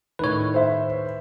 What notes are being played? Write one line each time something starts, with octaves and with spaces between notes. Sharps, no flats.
A2 D#3 B4 C#5
C5 E5